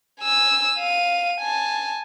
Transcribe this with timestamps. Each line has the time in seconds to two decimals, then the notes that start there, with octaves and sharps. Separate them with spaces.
0.21 G#5 E6
0.79 F5 D#7
1.41 G#5 A5